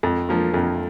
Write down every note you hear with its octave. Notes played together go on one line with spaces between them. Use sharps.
F2
F3 A#3
F2